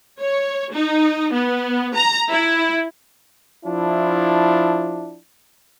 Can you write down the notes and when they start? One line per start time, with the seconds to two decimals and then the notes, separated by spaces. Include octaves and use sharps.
0.20 C#5
0.73 D#4
1.32 B3
1.95 A#5
2.31 E4
3.65 F3 D4 E4